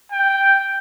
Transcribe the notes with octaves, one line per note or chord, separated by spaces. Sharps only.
G5